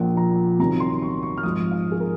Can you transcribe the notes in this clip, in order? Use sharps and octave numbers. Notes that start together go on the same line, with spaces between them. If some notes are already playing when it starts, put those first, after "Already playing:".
Already playing: A#1 A#2 F3 F#5
A#5
C2 C3 D#3 F#3 A#5
C6
C#6
C#6
F6
G#1 G#2 F3 D#6
F5
G#4
A#4